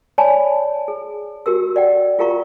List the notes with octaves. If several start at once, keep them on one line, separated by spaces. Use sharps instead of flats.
C#5 D5 G#5 A5 B5
G#4
F#4 G4 A#4 E6
D5 F#5 G5
F4 G4 A#4 F5 A#5 C#6